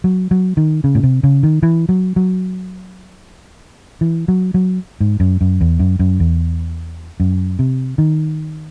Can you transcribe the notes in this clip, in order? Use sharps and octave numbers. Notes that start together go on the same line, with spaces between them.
F#3
F#3
D#3
C#3
A2
C3
C#3
D#3
E3
F#3
F#3
E3
F#3
F#3
G#2
F#2
F#2
E2
F#2
F#2
E2
F#2
C3
D#3